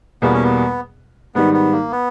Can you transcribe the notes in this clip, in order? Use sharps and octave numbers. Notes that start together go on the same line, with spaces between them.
E2 B2 G3 A#3 B3
C#4
B3
G#2 D#3 G3 B3
B3
A#3
B3